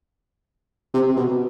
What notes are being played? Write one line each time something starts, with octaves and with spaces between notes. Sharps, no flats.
C3
B2